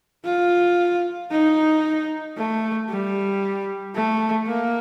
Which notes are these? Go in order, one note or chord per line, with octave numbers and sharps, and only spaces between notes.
F4
D#4
A3
G3
A3
A#3